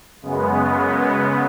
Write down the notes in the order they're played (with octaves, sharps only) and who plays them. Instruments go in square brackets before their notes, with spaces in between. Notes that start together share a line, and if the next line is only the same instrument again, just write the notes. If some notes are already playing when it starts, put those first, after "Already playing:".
[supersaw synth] F#2 C#3 G#3 B3